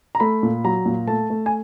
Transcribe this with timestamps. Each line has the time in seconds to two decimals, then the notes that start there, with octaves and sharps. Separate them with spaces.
0.15 A#5
0.20 A3 B5
0.43 A#2
0.64 F#3 A#5
0.86 A#2
1.07 A3 A5
1.30 A3
1.46 G#5